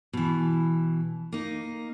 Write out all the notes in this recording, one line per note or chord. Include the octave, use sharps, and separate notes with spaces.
B2 E3
A#3 D#4